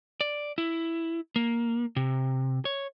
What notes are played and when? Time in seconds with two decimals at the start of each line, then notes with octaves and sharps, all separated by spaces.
0.21 D5
0.58 E4
1.36 A#3
1.96 C3
2.65 C#5